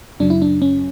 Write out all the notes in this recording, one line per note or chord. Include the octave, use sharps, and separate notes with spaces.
F#2 C#3 F#3 D4
E4
D4
C#4